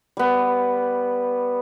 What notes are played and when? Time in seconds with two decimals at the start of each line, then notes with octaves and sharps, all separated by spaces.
0.17 G3 B3